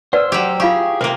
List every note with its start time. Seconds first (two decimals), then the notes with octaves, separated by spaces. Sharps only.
0.13 B4 C5 D5 F#5 E6
0.32 F#3 G4
0.60 F4 G4 G#4 F5 C#6
1.01 C3 A#3 A#4 F5 G5